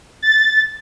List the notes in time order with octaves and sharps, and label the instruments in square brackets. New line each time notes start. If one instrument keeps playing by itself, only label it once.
[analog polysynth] A6